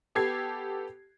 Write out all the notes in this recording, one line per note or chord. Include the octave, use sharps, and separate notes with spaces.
B3 G4 A4 G#6 C7